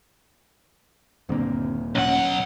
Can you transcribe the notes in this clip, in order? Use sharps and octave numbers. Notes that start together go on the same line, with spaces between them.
D#1 G2 D3 A#3 C4
B1 C#4 F#5